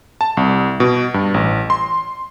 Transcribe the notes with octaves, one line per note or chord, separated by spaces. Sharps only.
A5
C2
B2
G2
A1
C6